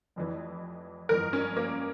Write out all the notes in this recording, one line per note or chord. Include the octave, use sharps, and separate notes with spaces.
F1 F2 E3
G1 F2 E3 A#4
C#4
A#3